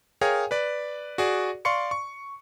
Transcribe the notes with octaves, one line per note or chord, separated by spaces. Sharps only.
G#4 A#4 C#5 F5 G5 G#5
B4 D5
F#4 G#4 D5
D5 F5 C6 C#6 C#7
C#6